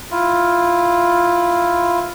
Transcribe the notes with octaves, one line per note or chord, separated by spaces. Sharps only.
E4 F4